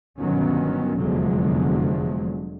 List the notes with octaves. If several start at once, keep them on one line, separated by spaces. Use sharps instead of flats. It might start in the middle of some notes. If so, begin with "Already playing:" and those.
G1 B2 D#3 F#3 B3 C#4
F1 E2 D3 F3 F#3 G#3